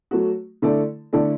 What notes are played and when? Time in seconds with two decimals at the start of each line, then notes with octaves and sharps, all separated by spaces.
0.11 F#3 A3 F#4
0.62 D3 A3 E4 A4 D5
1.13 D3 A3 E4 A4 D5